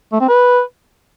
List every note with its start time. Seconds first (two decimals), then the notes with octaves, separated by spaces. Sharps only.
0.12 A3
0.20 C4
0.29 B4